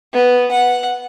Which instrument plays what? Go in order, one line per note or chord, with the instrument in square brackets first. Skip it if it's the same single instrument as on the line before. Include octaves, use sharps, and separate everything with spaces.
[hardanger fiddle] B3
F#5